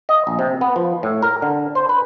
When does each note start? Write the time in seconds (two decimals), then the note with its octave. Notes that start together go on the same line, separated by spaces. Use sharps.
0.09 D#5
0.27 A#1
0.39 C3
0.61 B3
0.76 F3
1.03 A2
1.22 A#4
1.42 D3
1.75 C5
1.89 B4